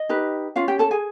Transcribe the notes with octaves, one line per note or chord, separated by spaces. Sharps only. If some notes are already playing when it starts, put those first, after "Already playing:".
Already playing: D#5
D#4 G4 B4
C#4 F4 F5
G4 G5
A4 A5
G#4 G#5